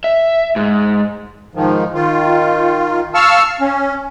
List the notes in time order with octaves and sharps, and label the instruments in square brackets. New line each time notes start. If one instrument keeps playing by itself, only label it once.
[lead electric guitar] E5
G#2
[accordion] G#2 D#3 F3
D#3 F4
F5 A5 C#6 E6 F6
C#4